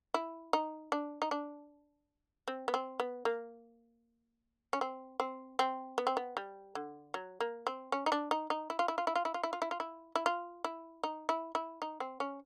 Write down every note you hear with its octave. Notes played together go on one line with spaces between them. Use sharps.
E4
D#4
D4
D#4
D4
C4
B3
C4
B3
A#3
C#4
C4
C4
C4
B3
C4
B3
G3
D3
F#3
A#3
C4
C#4
D#4
D4
D#4
D#4
E4
F4
E4
F4
E4
F4
E4
F4
E4
F4
E4
F4
E4
E4
F4
E4
D#4
E4
E4
D#4
C4
C#4